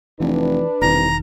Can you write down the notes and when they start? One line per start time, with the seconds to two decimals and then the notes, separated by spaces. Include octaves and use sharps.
0.20 F1 E3 D4 B4
0.81 E1 C2 D#3 A#5